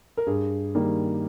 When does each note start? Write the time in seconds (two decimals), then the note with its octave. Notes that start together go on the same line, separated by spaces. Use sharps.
0.17 A#4
0.27 G2 G#4
0.75 D#3 G3 A#3